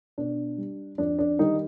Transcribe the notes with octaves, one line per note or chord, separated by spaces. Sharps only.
B2 D4
G3
F2 D4
D4
D#3 G3 D#4